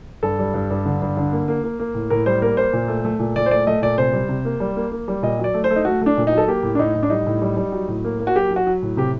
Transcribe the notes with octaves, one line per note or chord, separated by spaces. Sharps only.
G2 A4
G3
G2
G2
D3
G2
D3
A#3
A#3
A#3
A#3
A2
A2 A#4
G3 C5
A#3 A#4
A#3 C5
A#2
A3
A3
A#2
A#2 D5
C5
A3 D5
A3 D#5
A#2 D5
C3 C5
G3
C3
A#3
G3
A#3
A#3
G3
A#2 D#5
F#3 D5
A3
C5
A3
D#4
A3 F#4
A3 D4
A#2
D#4
F#3
A4
A#3 G4
A2
D4
A2 D#4
A2
D4
G3 D#4
A2
G3
G3
F#3
A2
A#3
A#3
F#4
F#3 G4
F#3
F#4
F#3
A2
C3 G4